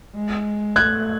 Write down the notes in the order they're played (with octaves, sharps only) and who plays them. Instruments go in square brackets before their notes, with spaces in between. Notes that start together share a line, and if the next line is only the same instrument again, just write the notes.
[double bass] G#3
[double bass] A3 [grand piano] F#6 G#6